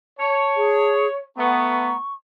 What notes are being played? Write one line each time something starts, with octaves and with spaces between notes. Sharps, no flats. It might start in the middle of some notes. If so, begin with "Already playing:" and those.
C#5 A5
G#4
A3 B3 A#5 C#6